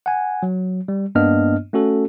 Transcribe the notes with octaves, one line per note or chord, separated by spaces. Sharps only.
F#5 G#5
F#3
G3
G2 A#3 B3 D4 D#5 F6
A3 C#4 F#4 A4